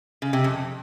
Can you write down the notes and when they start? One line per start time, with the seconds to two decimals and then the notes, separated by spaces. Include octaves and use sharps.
0.22 C#3
0.33 C3
0.44 F2